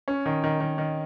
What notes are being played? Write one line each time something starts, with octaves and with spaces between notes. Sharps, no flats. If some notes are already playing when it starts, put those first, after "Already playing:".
C#4
D#3
D#3
D#3
D#3